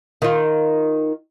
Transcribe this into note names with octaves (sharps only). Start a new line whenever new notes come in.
D#3 F4